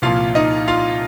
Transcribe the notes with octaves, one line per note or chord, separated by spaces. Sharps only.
C2 A#2 F3 F4 F5
D#4 D#5
F4 F5